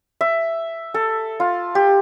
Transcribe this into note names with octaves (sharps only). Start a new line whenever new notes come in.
E5
A4
F4
G4